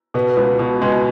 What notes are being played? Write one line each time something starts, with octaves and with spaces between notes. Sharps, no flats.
B2 B3
C#2
B2
B2 G#3